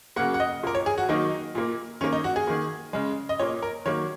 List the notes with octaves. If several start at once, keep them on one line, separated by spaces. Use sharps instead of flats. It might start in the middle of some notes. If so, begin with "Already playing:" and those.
C#3 F#3 A#3 F#5
F#5
D#5
A#2 A#3 A#4
C#5
G#4
F#4
D#3 F#3 A#3 D#4
A#2 A#3
D#3 A#3 C#4
D#4
F#4
G#4
D#3 A#3
C#3 G#3
D#5
A#2 A#3 C#5
A#4
D#3 F#3 A#3 C#5